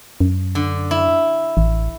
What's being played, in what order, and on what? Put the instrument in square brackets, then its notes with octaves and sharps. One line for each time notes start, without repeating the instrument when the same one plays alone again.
[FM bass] F#2
[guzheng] D3
E4
[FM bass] A1